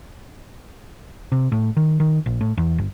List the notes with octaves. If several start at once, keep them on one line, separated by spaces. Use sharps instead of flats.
C3
A2
D#3
D#3
A#1
A2
E2
G1